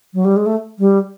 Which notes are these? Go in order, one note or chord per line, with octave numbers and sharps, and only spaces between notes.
F#3
G3
G#3
A3
G3